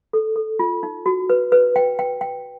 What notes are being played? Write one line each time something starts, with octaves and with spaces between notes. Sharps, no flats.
A4
A4
F4
D#4
F#4
B4
B4
G5
G5
G5